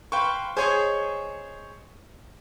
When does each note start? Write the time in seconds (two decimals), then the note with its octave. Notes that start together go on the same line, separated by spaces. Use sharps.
0.12 B4 C5 F5 G5 C#6
0.57 G#4 C5 C#5 D#5 C#6